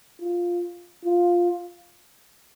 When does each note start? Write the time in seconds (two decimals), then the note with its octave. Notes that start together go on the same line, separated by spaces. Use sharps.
0.21 F4
1.05 F4